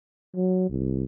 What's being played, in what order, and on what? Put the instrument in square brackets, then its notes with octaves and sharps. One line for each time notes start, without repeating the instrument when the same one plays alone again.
[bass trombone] F#3
C2